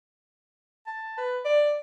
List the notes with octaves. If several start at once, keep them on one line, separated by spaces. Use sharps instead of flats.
A5
B4
D5